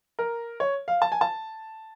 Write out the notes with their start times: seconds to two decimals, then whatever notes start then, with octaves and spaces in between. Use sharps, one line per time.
0.19 A#4
0.60 C#5
0.88 F5
1.02 A5
1.12 G#5
1.21 A5